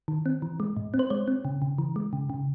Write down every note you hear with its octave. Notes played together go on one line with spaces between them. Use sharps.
D#3
C4
E3
G#3
A2
C4
C5
G#3 C#5
C4
C#3
C#3
E3
G#3
C#3
C#3